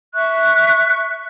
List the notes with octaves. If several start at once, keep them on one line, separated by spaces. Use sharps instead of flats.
E5 C#6 F#6